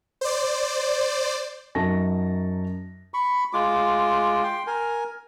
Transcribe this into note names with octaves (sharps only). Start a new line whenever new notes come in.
C5 D5
F#2 F#3 D#4 A5 C#6 A#6
B5 C#6
G#3 F4 D6
G5 C6
A#4 G#5